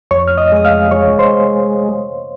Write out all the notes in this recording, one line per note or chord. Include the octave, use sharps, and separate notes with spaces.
F2 C#5 C#6
F6
D#5 D#6
G#3 D#6
F5 F6
G#3 C#5 C#6
C5 C6